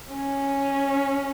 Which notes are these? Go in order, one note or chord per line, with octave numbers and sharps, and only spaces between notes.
C#4